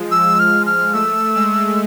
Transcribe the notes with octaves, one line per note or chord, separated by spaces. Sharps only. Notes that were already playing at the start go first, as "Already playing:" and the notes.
Already playing: F3 G#3
F3 E6
F6
G#3
F6
A3 E6
G#3